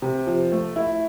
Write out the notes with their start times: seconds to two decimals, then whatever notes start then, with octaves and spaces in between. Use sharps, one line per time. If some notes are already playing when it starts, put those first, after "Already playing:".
0.02 C3
0.27 F3
0.52 A3
0.76 E4